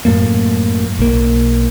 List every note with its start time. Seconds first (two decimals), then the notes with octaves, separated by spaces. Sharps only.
0.05 F#2 A2 A3 A#3
0.99 B1 A#3